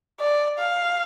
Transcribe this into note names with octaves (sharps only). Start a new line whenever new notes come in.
D5
F5